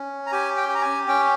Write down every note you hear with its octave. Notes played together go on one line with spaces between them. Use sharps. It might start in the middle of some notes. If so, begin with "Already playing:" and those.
Already playing: C#4
A#5
G4 G#5
G5
G4
A#5
G#5
C#4 G5